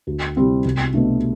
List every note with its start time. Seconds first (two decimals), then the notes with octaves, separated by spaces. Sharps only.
0.07 D2
0.36 C3 G3 C4 E4
0.65 C2
0.94 B2 A3 D4